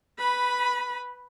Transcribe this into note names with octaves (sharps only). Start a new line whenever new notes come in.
B4 B5